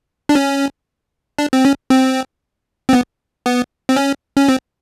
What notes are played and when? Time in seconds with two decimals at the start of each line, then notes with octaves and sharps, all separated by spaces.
0.29 D4
0.35 C#4
1.38 D4
1.53 C4
1.65 C#4
1.90 C4
2.89 C4
2.93 B3
3.46 B3
3.89 C4
3.96 C#4
4.37 C#4
4.49 C4